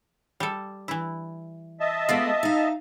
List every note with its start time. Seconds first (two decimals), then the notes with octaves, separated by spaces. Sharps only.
0.40 G3 A4
0.88 E3 E4
1.80 D#5 E5 A5
2.09 G#3 A3 B3 F4 D5
2.43 D#4 F5